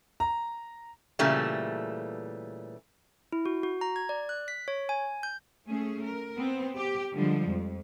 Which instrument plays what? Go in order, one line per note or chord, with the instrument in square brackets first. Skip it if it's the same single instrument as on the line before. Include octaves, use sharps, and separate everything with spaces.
[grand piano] A#5
[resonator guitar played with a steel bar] A#2 C#3 E3 G3 A3
[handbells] E4
F#4
F#4
A#5
G#6
D5
F#6
B6
C#5
G#5
G6
[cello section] A3 C#4 G#4
A#4
B3 C4
G4
D3 F3 G3 G#3
F2